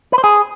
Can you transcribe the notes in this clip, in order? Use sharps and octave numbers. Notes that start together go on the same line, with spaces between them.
B4
C5
G#4